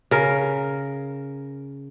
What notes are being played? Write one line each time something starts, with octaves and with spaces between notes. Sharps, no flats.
C#3 A#4